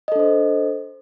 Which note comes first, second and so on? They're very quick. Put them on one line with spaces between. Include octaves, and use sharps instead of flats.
D#5 A4 D4 C5